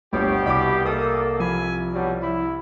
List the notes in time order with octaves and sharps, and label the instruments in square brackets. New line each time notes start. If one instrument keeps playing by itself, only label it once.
[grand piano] G1 D2 [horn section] B2 G4 [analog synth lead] C#5
[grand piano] C2 D6 [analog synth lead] B5
[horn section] A#3 A4 [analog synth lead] D#6
[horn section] C3 E4 G#5 [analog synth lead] F3
[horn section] B2 F#3 G3
E4